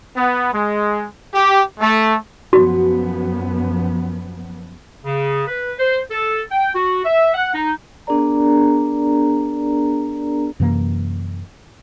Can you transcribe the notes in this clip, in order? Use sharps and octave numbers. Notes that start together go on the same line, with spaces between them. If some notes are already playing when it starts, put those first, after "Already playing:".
B3
G#3
G4
A3
F#2 F3 B3 F#4
C#3
B4
C5
A4
G5
F#4
E5
F#5
D#4
B3 D4 G#4 A#4 D5 A#5
F#2 C3 E3 A#3